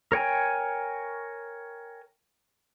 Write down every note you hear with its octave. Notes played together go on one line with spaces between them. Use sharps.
A#4 C#5 G5 G#5